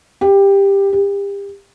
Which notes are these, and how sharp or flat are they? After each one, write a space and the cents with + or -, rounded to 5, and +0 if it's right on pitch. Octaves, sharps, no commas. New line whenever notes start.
G4 +15
G4 +35